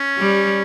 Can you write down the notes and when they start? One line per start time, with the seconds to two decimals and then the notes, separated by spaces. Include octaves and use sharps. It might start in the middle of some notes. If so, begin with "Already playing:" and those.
Already playing: C#4
0.18 G3